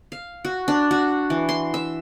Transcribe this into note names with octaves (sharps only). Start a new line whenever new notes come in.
F5
F#4
D4
F#4
E3
C6
E5